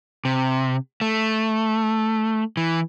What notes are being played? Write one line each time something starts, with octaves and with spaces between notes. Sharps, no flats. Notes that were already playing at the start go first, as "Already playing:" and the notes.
C3
A3
E3